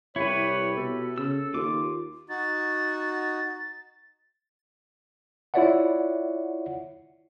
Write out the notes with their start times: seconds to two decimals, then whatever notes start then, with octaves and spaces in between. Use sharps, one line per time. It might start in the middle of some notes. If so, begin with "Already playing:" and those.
0.16 C2 E4 G4 B4 C#5
0.77 B2 A4
1.18 C#3 E6
1.54 D#2 F4 D6
2.29 D#4 F#4 A6
5.54 E4 F4 C#5 D5 E5 F#5